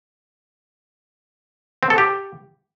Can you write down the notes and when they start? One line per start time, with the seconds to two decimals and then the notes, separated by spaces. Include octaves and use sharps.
1.83 C4
1.90 A4
1.98 G4